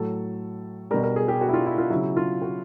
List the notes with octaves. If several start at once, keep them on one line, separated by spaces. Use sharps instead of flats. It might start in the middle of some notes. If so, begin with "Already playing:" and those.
Already playing: A2 F#3 A4
B2 G3 A#4
A#4
G#4
G4
F#4
E4
F4
E4
F4
C#3 F#3 E4
F4
F#4